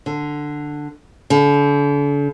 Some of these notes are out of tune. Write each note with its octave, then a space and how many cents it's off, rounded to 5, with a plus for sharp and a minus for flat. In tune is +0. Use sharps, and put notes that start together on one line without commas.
D3 +10
D3 -40